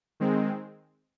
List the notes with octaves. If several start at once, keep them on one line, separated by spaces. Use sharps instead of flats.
D#3 G#3 C4